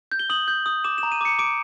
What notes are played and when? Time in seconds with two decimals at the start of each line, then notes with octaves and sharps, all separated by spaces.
0.12 G6
0.19 G7
0.30 D#6 F#7
0.48 G6
0.66 D#6
0.84 D6 E7
0.98 E7
1.03 A#5
1.12 D#7
1.21 D6 C#7
1.39 D6 D7